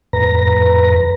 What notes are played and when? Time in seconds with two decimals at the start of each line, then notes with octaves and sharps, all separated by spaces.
0.13 F2 A2 B4 A#5 A#6